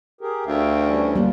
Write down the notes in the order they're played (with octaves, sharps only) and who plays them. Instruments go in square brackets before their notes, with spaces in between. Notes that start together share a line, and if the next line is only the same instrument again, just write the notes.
[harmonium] G4 G#4 A#4
[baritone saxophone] D2 [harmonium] E5 F5 G5
[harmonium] E3 G3 C#4
[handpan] G3 A#3 [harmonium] F4